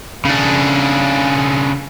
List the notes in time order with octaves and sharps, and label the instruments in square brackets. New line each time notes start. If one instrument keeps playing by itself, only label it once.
[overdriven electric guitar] C#3 D4